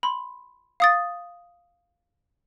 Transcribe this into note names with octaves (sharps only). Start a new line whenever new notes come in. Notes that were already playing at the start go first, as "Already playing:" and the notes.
B5 C6
F5 D#6 A6